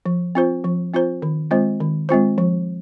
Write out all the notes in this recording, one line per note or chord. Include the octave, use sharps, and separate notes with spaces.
F3
C4 F4 C5
F3
C4 F4 C5
D#3
G#3 C4 F4 C5
D#3
G#3 C4 F4 C5
F3